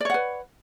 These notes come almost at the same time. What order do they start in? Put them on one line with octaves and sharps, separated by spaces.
D5 C#5 F#5 B4